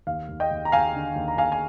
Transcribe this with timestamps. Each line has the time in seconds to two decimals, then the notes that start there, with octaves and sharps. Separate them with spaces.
0.07 D#2 F5
0.29 D#2
0.40 D#5 G5
0.51 D#2
0.65 A#5
0.72 D#2 F5 G#5
0.94 D3
1.16 D#2
1.28 A#5
1.37 D#2 F5 G#5
1.52 G#5